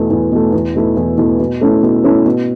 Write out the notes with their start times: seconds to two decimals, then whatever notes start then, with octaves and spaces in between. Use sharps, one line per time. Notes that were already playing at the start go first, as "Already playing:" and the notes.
Already playing: E2 B2 A3
0.11 E2
0.32 B2 A3
0.53 E2
0.75 B2 A3 E4
0.97 E2
1.17 B2 A3 E4
1.40 B2
1.61 A3 C#4 E4
1.83 B2
2.04 A3 C#4 E4
2.26 B2